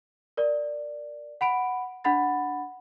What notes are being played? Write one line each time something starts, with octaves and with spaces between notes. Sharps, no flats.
A#4 D5
F#5 B5 D7
D4 F#5 B5 A6